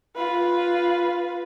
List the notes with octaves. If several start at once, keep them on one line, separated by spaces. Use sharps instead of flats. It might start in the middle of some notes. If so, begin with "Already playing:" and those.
F4 B4